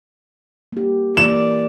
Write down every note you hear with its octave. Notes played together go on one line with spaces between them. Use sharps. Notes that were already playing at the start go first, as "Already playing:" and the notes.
A#3 G4
E3 A#3 D5 E7